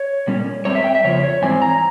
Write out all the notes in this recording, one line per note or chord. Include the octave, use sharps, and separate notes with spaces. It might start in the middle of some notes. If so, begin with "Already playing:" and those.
Already playing: C#5
A#2 G3 C#4
G2 G3 C4 C#5
E5
G5
E5
F2 C#3 F3 C#5
C#5
G#2 E3 G3 C4 G#5
A#5